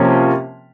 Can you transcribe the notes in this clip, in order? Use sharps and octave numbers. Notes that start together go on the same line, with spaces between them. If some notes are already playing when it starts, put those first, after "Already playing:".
Already playing: C3 F3 A#3 C#4